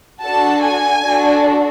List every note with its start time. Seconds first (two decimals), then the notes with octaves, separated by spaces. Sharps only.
0.21 D4 F#4 A4 A5
0.62 G#5
1.03 D4 F#4 A4